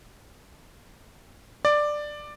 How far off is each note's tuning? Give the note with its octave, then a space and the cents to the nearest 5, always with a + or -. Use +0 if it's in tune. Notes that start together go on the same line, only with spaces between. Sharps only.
D5 +10